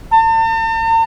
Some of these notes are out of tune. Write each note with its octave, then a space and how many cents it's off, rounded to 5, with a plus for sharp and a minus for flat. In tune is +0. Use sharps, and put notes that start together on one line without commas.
A5 +45